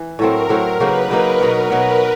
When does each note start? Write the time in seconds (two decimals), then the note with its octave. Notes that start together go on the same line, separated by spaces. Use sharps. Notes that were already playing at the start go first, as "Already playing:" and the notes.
Already playing: E3
0.19 A2 F#3 A3 C4 A#4
0.49 A2 F#3 A3 C4
0.80 C#3 F#3 A#3 D#4 B4
1.09 C#3 F#3 A#3 D#4 A#4
1.41 B2 F#3 B3
1.70 B2 F#3 B3 B4